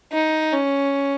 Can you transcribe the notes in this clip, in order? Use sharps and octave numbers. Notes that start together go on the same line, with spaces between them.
D#4
C#4